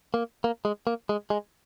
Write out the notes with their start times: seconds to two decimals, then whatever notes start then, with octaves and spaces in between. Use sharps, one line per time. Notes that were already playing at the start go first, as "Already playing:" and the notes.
0.14 A#3
0.44 A#3
0.65 G#3
0.87 A#3
1.09 G#3
1.30 G#3